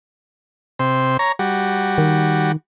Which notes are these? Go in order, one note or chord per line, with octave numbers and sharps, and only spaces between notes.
C3 C5
C#5 A#5
G3 F#4
D#3